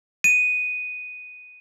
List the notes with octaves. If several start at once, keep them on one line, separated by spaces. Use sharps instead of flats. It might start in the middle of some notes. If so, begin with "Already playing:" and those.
D#7